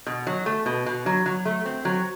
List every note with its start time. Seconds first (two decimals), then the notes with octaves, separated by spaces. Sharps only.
0.06 B2
0.27 F#3
0.46 A3
0.66 B2
0.86 B2
1.06 F#3
1.26 F#3
1.45 A3
1.65 C4
1.85 F#3